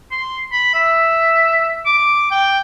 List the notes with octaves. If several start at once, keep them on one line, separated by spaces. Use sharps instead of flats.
C6
B5
E5
D6
G5